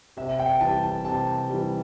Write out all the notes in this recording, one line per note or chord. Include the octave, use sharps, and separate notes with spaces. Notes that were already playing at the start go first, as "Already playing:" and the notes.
C3 E5
G5
E3 G3 A5
A5
C3 A5
E3 G3